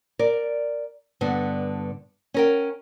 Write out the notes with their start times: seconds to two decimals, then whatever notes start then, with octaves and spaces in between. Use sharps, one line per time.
0.19 A#4 D5
1.21 G2 D3 B3
2.34 C#4 A#4 G5